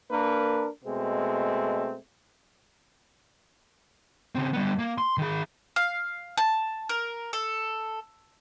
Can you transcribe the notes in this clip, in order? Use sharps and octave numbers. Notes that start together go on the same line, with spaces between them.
A#3 D4 A#4 B4
B2 G#3 A3 C4
C#3 C4
G3 B3
A#3
C6
D#3 G#4
F5
A5
A#4
A4